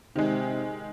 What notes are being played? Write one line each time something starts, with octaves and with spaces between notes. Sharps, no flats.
C3 D#3 G#3